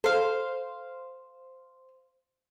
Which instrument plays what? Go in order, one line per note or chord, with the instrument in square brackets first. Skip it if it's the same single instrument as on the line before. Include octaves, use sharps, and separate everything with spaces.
[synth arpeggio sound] A4 [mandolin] C5 F5